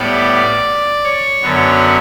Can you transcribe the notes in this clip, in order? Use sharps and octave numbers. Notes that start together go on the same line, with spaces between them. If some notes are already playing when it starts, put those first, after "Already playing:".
Already playing: A2 G3 B3 D5
C#5
F#2 D3 F#3 B3